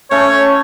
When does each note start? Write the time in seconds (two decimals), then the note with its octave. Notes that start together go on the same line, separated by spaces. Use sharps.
0.11 A3 C#4 C#5